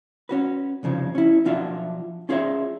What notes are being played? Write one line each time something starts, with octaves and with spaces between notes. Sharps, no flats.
C#4 F#4 B4
C2 F2 C#3 F3
C#4 E4
B1 F3 D4 F4 F#4 E5
C#4 F4 G#4 C5 C#5 E5